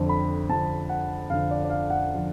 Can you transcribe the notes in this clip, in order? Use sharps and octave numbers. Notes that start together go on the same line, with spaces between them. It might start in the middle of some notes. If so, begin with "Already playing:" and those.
Already playing: F2 D3 F3
B5
F2 D3 F3 A5
F#5
F2 D3 F3 F5
D5
D5
F5
F#5
D3 F3